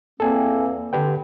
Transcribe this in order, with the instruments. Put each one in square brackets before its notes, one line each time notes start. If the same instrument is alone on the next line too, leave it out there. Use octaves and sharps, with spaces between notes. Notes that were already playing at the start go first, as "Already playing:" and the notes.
[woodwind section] E2 A#3 C4 [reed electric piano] A4 G#5
[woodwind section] D3 [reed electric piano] G4 B4 G5